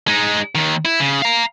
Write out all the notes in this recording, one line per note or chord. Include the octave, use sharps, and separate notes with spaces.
G#3 D#4
D#2 D#3
E4
C#3
F5 A#5